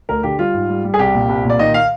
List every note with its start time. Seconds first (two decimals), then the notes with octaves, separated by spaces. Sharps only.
0.09 D2 A#4
0.23 D3 G4
0.39 G3 F4
0.54 G#2
0.69 G3
0.84 G3
0.94 G#4
0.99 C2 G4
1.14 A#2
1.29 C2
1.45 A#2
1.50 D5
1.59 D#3 D#5
1.74 F5